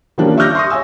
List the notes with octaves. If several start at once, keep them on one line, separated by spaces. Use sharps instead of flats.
D#3 F3 G3 A#3 C#4 D4
E5 C#6 D6 F6 G6 A#6
C6 C#6 D#6
C#5 E5 G#5 E6